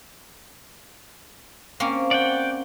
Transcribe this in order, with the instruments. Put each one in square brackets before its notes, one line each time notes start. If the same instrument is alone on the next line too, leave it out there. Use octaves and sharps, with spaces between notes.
[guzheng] A#3 C4 C#4
[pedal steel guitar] D5 F#5 G5